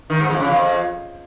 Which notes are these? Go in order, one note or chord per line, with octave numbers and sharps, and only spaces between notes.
D#3
G#2
F2
C#3
F2